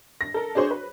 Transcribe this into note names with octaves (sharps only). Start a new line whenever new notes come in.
A#6
A4 A#4
D4 F#4 G#4 C5 C#5
B4